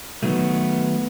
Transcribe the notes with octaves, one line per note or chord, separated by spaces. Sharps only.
D#3 F#3 A3 B3